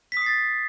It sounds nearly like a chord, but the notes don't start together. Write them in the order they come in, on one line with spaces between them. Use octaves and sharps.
B6 D#6 C7 A6